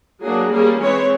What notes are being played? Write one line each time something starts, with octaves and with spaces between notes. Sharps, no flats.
F#3 A#3 D4 G#4
G3 A#3 C#4 G#4
E3 G#3 C4 C#5